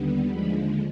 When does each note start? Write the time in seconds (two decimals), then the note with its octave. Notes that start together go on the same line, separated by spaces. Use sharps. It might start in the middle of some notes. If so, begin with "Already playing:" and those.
Already playing: D#2 D3 G3 B3
0.29 D#2 D3 F3 G#3 B5